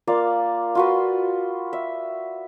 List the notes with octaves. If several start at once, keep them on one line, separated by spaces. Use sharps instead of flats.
A#3 F4 D5 F5
F4 F#4 B4
E5